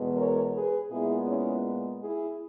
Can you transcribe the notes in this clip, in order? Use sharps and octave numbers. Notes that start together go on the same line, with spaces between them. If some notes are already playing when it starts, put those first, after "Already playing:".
Already playing: E2 B2 G#3 B3
A#4 C#5
G#4 B4
A#2 G#3 B3 E4 G#4
C#4 E4
E4 G#4